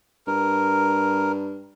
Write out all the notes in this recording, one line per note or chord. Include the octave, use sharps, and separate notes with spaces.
G2 A#4